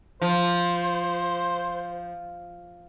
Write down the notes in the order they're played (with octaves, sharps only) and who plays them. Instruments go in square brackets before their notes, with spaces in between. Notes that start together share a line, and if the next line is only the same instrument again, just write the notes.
[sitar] F3 [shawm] C5